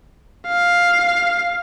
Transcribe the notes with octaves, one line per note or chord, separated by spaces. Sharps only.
F5